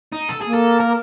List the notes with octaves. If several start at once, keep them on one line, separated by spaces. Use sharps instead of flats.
D#4
A4
A#3 G#4
A4
A#4